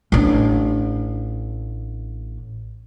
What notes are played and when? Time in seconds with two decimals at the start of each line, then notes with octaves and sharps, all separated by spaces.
0.12 A1 D4